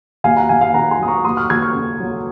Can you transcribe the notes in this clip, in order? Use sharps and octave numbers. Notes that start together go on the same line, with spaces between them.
D#2 F5 G#5
F#5 A#5
D#2 F5 G#5
F5 G#5
D#3 F#5 A#5
G#5 C6
F#3 D#6
A#5 C#6
D#2 C6 D#6
C#6 F6
D#2 F6 G#6
C#6 F6
C#3
F#3